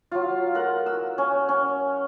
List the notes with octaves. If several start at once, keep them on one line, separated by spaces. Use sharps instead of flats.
F#3 F4
A#4 F#5
E6
C#4
C#4